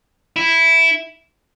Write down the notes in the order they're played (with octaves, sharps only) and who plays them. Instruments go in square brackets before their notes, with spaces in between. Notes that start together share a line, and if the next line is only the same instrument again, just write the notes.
[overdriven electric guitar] E4